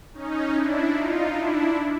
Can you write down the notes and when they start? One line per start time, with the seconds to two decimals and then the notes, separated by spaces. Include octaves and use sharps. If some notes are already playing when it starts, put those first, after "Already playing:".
0.14 C#4 D#4
0.53 D4 E4
0.93 D#4 F4
1.32 D4 E4